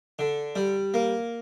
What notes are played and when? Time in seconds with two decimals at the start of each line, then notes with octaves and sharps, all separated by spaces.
0.19 D3
0.56 G3
0.94 A#3